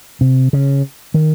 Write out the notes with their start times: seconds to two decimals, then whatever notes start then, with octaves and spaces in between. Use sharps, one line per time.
0.21 C3
0.53 C#3
1.14 D#3